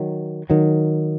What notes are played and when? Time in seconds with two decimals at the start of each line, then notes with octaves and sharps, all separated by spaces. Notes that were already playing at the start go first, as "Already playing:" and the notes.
Already playing: D#3 F#3
0.50 D#3 F#3